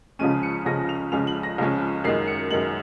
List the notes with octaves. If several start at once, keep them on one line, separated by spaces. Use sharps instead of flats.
C#2 C#3 F3 G#3 C#4 D#7
C#7
C#2 C#3 F3 G#3 C#4 A#6
F7
C#2 C#3 F3 G#3 C#4 F7
F#7
A#6
C#2 C#3 F3 G#3 C#4
F#2 D#3 G#3 C7
C#7
F#2 D#3 G#3 F#7